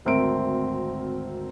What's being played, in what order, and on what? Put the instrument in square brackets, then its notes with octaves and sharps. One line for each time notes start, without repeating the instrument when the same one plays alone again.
[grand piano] G#1 D2 C4 A#4 E5 D7